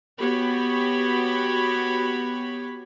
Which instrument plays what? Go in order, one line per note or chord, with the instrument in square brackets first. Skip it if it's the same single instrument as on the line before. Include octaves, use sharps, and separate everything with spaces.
[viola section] B3 F#4 G4 C#5 B5